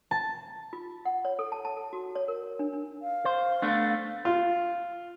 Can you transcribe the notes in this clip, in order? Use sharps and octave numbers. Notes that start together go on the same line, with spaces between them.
A5
F4
F#5
C#5
A4
A5
A5
A4
F#4
C#5
A#4
D4
D4
F5
C5
A3 B3 D4
F4